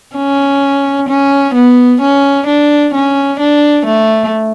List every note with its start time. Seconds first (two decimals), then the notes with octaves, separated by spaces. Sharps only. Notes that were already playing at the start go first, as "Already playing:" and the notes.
0.16 C#4
1.09 C#4
1.55 B3
2.01 C#4
2.47 D4
2.94 C#4
3.40 D4
3.86 A3